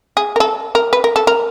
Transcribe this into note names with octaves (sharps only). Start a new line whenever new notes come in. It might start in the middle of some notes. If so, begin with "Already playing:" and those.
G#4
A#4
A4
A#4
B4
A#4
A4
A#4